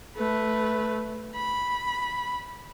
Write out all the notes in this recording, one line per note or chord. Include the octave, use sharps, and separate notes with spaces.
A3 B4
B5